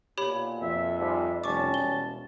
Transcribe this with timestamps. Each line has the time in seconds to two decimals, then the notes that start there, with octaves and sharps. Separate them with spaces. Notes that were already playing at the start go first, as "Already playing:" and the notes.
0.18 B1 A#2 G4 C#5 B5
0.62 F2 E5
0.98 G#2 F3 G3 E5
1.44 F1 G3 C#4 A5 C#6 D6
1.74 E1 G7